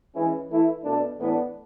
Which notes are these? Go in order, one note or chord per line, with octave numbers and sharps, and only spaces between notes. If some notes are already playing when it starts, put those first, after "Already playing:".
E3 G#3 C#4 E4
E3 A3 E4
B2 A3 D4
A2 E3 B3 D4